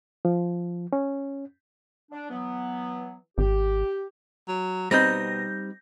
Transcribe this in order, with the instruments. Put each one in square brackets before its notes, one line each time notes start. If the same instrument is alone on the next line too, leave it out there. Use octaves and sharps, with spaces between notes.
[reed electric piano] F3
C#4
[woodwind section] D4
E3 F#3 B3
[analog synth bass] G#1 [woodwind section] G4
[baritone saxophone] F#3
[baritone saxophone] B2 [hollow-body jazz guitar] G3 C4 D#4 [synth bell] G6 A#6